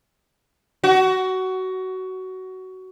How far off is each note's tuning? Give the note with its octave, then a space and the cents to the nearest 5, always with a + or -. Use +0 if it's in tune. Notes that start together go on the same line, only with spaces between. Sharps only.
F#4 +20